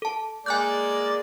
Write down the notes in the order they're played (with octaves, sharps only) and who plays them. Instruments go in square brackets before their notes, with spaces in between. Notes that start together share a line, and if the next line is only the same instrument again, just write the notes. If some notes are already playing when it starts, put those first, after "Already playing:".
[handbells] A4 A5
[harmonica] G#3 A#3 D5 [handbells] G#5 F#6 G6